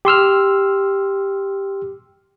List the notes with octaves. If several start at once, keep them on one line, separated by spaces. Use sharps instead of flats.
G4 C6 E6 F6